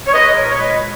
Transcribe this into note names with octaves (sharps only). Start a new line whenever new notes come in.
C#5
G#3 B4 D#5
A#2 A#4 C#5
C#5
G#3 B4 D#5